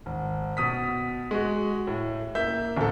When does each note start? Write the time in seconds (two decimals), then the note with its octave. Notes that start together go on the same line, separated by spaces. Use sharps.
0.06 G#1
0.57 B2 D#6 B6
1.31 G#3 F#4
1.87 A2
2.35 A#3 E5 G6
2.77 D1 A4